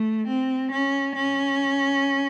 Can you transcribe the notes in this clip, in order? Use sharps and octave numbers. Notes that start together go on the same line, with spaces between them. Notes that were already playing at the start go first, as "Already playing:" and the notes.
Already playing: A3
C4
C#4
C#4